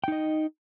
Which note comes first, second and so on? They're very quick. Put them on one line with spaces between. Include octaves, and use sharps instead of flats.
G5 D#4 D#5